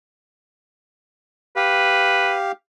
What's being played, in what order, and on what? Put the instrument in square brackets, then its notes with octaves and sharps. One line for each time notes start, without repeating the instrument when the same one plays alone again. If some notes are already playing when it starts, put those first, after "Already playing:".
[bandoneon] G4 F5 [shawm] B4